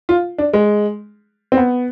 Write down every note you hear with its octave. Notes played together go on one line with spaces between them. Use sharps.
F4
D4
G#3
C4
B3